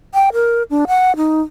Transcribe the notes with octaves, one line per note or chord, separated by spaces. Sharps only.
G5
A#4
D4
F#5
D#4